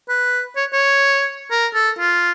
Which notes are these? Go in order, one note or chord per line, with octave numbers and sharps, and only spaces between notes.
B4
C#5
C#5
A#4
A4
F4